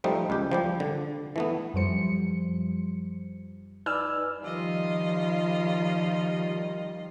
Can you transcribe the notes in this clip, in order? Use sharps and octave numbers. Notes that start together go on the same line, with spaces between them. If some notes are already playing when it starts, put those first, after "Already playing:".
F3 G3 A3 D#4
C#2 G4
F3 G3 G4
D3
E3 A3 B3
F#2 F3 G3 C5 C#7
D#4 B4 D5 G#5 E6 F6
D#3 F3 G3 F4 D#5